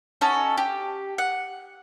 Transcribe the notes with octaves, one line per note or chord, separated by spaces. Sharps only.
C#4 D#4 F#4 A4
G4
F#5